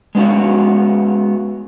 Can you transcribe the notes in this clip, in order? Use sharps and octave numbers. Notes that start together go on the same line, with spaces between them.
G#3 B3 C#4 F#4